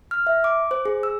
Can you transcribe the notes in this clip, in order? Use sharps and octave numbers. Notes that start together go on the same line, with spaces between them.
F6
E5
D6
C5
G#4
E6